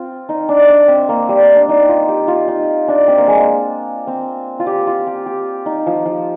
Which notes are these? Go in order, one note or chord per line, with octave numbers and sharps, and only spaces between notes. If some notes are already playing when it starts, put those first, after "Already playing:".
Already playing: C4 F4
D#4
D4
D4
C4
A#3
G3
D4
D#4
F4
G4
F4
D#4
D4
C4
A#3
G#3
A#3
C4
F4
G4
F4
G4
G4
D#4
F3
F3